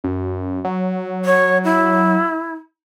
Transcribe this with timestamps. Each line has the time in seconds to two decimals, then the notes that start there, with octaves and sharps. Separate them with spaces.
0.04 F#2
0.65 F#3
1.25 C#5
1.64 E4